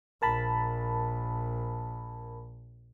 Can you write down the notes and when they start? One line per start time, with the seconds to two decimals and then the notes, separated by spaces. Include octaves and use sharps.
0.22 A#1 A#4 A5 B5